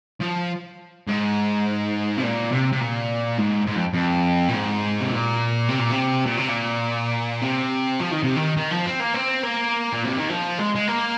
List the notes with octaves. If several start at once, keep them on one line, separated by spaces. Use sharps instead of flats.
F3
G#2
C3
A#2
C3
C3
A#2
G#2
G#2
F2
F2
A#2
G#2
C3
A#2
C3
A#2
C3
A#2
C3
A#2
C3
F3
D#3
C3
D#3
D#3
F3
C4
A#3
C4
A#3
A#2
C3
D#3
F3
G#3
G#3
A#3